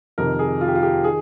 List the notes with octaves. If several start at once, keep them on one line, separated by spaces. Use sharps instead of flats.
F2 C3 D#3 A#4
G#4
F4
G4
F4
G4
D#3 G#4